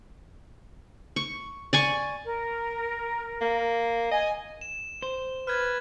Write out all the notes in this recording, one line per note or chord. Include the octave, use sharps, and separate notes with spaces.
C#6
D5 G#5 C#6
A#4
A#3
D#5 G#5
E7
C5
B4 F6 G#6 A6